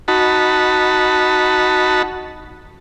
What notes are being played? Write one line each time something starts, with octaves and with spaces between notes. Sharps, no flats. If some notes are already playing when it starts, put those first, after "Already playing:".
D#4 F#4 A5 B5